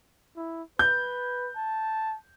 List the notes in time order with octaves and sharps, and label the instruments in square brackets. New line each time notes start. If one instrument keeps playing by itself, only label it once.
[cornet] E4
[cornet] B4 [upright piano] G6
[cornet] A5